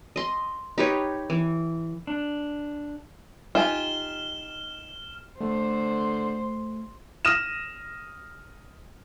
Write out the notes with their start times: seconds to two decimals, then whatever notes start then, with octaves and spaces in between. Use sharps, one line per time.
0.16 D#5 C6
0.78 D#4 G4 B4 C#5
1.30 E3
2.07 D4
3.55 D#4 F4 G4 G#5 F6 E7 G7
5.40 D3 A3 C5
7.25 D#6 F6 A#6 D#7 E7